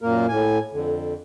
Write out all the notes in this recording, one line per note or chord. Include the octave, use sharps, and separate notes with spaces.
F#2 A#2 A#3 A#4
A2 G#5
F2 D3